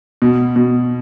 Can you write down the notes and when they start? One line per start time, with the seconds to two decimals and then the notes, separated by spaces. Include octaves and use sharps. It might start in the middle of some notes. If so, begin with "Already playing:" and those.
0.22 B2
0.56 B2